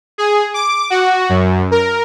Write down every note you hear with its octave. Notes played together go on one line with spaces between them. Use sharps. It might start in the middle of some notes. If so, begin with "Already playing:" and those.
G#4
D6
F#4
F#2
A#4